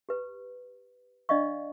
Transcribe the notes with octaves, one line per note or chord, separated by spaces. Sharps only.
G4 B4
D4 D5 D#5 F5 C#6